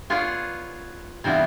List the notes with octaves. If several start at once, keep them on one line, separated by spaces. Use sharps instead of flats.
B3 F4 G#4 B4 C#5 D5
C3 E3 G3 B3 F4